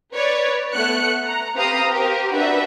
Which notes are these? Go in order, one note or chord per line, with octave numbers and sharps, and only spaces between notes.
B4 C#5 D5
A3 B3 F#6 C#7
A#5
C4 G4 B4 F5 A#5 D#6
G4 A#4 C5
D4 F#4 B4 E5